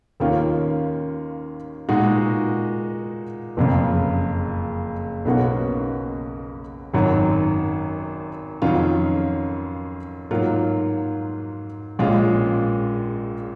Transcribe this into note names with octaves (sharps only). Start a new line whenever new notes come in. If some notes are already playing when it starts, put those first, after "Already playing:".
D#2 D#3 A#3 C#4 F4
A#2 G#3 D#4 F#4
F#1 F2 C#3
B1 B2 A#3 C#4 F#4
G#1 F#2 D#3 F#3
F2 D#3 F#3 C#4 F4
G#2 F#3 A#3 F4
A#1 A#2 G#3 C#4 F4